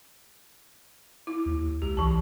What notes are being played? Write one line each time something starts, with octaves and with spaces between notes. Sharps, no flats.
E4
D#2
C#2 G4
B1 E3 A5